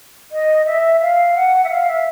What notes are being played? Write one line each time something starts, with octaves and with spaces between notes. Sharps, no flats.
D#5
E5
F5
F#5
E5
F5
E5